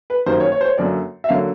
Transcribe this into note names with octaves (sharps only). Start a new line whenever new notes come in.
B4
F#2 D#3 G3 A#3 C5
C#5
C#5
C5
C#5
F#2 D3 F#3 A#3 D5
E5
D3 F#3 A#3 F5